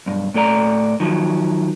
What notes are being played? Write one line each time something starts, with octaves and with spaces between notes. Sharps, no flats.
B1 G2
A2 A3 A4 D5 A#5
D#3 F3 F#3